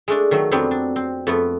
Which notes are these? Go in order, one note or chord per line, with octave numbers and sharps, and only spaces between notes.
G#3 A3 D4
D#3 F#3 A3
F2 F#3 B3 C4 D4
D4
C4
F2 A3 B3